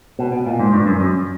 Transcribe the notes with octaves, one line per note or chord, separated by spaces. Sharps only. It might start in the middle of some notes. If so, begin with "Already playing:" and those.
B2
B2
A#2
G#2
G2
F#2
F#2